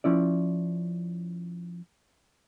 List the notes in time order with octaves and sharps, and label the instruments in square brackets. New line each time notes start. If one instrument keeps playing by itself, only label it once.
[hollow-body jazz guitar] F3 C#4 E4 D5